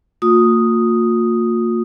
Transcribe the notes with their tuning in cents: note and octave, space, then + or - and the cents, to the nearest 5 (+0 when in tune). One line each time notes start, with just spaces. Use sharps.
A#3 -35 F4 +40 D#6 +0